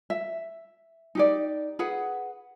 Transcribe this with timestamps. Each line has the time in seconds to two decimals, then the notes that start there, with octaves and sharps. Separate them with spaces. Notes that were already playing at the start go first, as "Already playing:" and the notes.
0.10 E5
1.15 D#4 G4 D5
1.79 G#4 B4 F#5